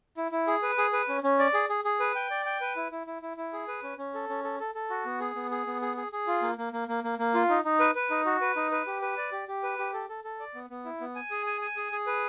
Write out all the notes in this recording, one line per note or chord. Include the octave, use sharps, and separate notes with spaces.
E4
E4
G#4
B4
G#4
B4
C#4
C#4
D5
G#4
G#4
G#4
B4
G5
D5
G5
B4
E4
E4
E4
E4
E4
G#4
B4
C#4
C#4
A4
C#4
A4
A4
A4
F#4
B3
G#4
B3
G#4
B3
G#4
G#4
G#4
F4
A#3
A#3
A#3
A#3
A#3
A#3
F4
D#4
D#4
B4
B4
D#4
F#4
B4
D#4
B4
G4
B4
D5
G4
G4
B4
G4
A4
A4
A4
D5
B3
B3
E4
B3
G#5
G#4
G#5
G#5
G#4
G#4
B4